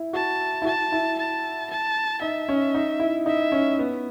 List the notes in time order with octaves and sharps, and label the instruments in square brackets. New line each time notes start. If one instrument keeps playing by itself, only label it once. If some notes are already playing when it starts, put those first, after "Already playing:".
Already playing: [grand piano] E4
[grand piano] F#4 [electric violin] A5
[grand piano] E4
[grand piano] F#4 [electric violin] A5
[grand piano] E4
[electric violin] A5
A5
[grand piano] D#4 [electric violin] E5
[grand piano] C#4
D#4
E4
[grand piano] D#4 [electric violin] E5
[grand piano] C#4
B3